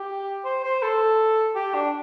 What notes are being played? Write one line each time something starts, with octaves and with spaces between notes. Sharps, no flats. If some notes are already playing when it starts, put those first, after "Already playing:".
Already playing: G4
C5
C5
A4
G4
D4